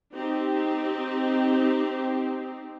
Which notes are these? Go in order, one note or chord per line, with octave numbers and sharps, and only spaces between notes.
C4 D#4 G4